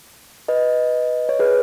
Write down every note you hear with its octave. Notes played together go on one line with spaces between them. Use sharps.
B4 D#5
C#5
G#4 B4